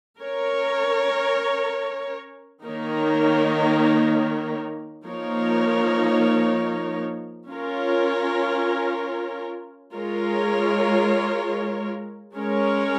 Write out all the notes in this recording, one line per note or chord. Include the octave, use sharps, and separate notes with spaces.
C#4 A#4 C#5
D#3 A#3 D#4 A#4 C#5
F3 A#3 D#4 A#4 C#5
C#4 F4 A#4 C#5
G#3 F4 A#4 C#5
G#3 C#4 A#4 C#5